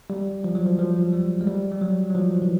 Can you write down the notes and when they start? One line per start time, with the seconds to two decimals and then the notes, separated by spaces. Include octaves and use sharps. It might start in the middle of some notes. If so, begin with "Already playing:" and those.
0.10 G3
0.44 F3
0.55 F#3
0.66 F3
0.79 F3
1.13 G3
1.41 G#3
1.47 G3
1.72 G3
1.82 F#3
2.10 F#3
2.15 F3
2.42 E3